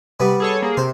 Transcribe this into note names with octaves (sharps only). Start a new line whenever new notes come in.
C3 G3 B3
G#4 A4 C#5
A#3 G#4
C3 C5